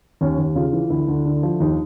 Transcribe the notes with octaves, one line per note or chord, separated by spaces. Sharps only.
D#2 C#4
D#2
C#3 F4
E3
D2 E4
D2
D3
F3
D#2 D#4